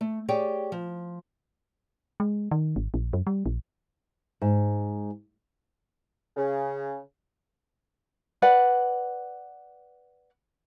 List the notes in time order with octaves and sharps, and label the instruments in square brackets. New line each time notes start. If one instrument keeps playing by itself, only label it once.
[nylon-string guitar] A3
G4 G#4 C#5 D5 G5
F3
[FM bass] G#3
D#3
G#1
A#1
F#2
G3
A#1
[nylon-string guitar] G#2
[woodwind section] C#3
[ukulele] B4 D5 F#5